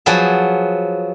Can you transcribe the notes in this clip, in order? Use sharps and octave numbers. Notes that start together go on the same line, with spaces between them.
F3 F#3 B3 G#4 A5